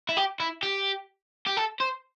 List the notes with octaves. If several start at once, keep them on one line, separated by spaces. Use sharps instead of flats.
E4
G4
E4
G4
G4
A4
C5